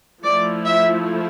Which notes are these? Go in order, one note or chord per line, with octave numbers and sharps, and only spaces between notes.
F3 A3 E4 D5
E5